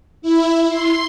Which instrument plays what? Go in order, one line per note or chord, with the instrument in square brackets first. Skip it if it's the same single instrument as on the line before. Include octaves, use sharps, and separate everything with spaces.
[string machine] E4
C6